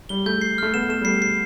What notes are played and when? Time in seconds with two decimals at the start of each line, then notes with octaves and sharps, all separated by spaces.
0.09 G3 G7
0.26 A3 G6
0.41 C7
0.58 A3 F6
0.74 B3 E7
0.89 A3 E7
1.01 G3
1.05 A3 C7
1.22 C7